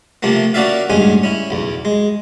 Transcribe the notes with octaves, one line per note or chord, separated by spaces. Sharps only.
C3 F3 A3 A#3
A#3 C#4 F#4 D5 E5 F5
A1 G2 G#3 C#4 G#5
C#4 E4
B1 E2
G#3